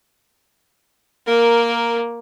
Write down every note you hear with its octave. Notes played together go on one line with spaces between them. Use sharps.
A#3 A#4